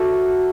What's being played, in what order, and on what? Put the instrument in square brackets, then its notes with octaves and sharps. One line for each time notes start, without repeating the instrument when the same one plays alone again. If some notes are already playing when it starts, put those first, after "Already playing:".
Already playing: [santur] F#3 F#4 A4 B4 E5